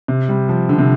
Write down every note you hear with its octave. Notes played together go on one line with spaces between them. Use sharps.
C3
G3
F3
D3
C3